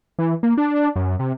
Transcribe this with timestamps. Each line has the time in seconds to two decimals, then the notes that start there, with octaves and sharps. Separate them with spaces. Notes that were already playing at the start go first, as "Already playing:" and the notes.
0.19 E3
0.43 A#3
0.58 D4
0.96 F#2
1.19 C3